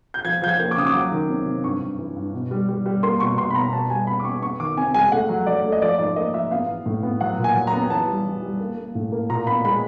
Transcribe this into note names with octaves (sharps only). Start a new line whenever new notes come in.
G6
F3 G#6
F3 G6
G#6
A#3
D6
C#3 D#6
D6
F#3
D#3
C3
C3
G2 C#6
G2
E3
G2
B2
G3
G3
G3
A#3 C6
B2 C#6
B2 C6
B5
B2 A#5
B2 A5
G3 G#5
B3 B5
D6
B3 C#6
B3 C#6
D#3 D6
C3 G#5
G#3 G#5
A3 F#5
F#3
F#3 D5
A3
D#5
F3 D5
G#2 D5
A#3 D#5
F3 E5
B3 F5
E3
A2
B3
F#3 F#5
A#2
G#5
F#3
A#5
B3
E3 A5
G3
E3
G3
A#3
A#3
A2
A#3
A#2 A#5
B3 B5
G#3 B5